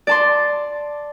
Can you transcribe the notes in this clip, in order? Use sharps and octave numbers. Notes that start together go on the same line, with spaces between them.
D5 A5 C6